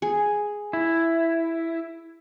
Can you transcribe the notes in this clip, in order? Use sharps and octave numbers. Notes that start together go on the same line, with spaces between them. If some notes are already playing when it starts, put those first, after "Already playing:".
G#4
E4